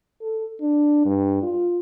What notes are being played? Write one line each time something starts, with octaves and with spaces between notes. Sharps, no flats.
A4
D4
G2
F4